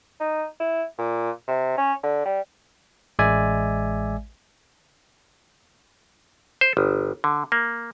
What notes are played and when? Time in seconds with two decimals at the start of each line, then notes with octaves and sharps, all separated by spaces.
0.20 D#4
0.60 E4
0.98 A#2
1.48 C3
1.78 C#4
2.03 D3
2.25 G3
3.19 A1 G#3 D5 E5 G#5
6.61 C5
6.77 G1
7.24 D3
7.52 A#3